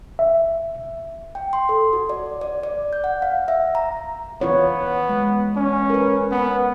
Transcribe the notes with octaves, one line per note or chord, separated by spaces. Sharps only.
E5
G5
C6
A4
F#4
D5
D5
D5
G6
F#5
F5
E5
A#5
E3 B3 F4 C#5
G#3
C#4
A#4 B4
B3